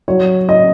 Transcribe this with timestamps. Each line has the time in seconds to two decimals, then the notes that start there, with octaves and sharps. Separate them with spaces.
0.08 F#3 C#5
0.49 D#5